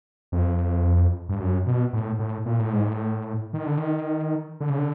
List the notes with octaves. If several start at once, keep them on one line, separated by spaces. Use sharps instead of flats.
F2
G2
F#2
B2
A2
A2
A#2
A2
G#2
A2
D#3
D3
D#3
D3
C#3
D3